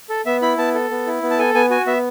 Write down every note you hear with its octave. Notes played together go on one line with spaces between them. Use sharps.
A4
B3 E5
E4 B5
B3 A5
A4
B3
E4
B3
A5
A4 G#5
B3 G#5
F#4 G#5
B3 E5